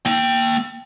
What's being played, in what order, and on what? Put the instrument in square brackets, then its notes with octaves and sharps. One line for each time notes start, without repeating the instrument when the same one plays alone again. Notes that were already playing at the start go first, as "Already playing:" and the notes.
[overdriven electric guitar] A#3 G5